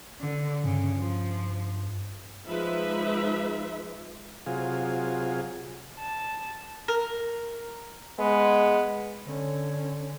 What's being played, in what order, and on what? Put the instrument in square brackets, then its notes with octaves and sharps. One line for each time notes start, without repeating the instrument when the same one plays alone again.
[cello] D3
[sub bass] G2 [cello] C#3
[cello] F3
[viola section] F3 G#3 D#4 B4 E5
[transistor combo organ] C3 F#3 F4 G#4
[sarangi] A5
[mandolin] A#4
[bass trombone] G#3 [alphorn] B3
[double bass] D3 C#4